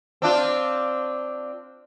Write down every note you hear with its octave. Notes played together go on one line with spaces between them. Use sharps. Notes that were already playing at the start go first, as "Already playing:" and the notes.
C4 D4 F4